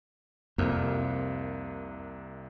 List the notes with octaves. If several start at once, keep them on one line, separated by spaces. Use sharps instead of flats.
C2 F2 C3 A#3